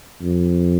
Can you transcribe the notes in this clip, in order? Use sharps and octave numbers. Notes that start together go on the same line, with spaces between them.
F2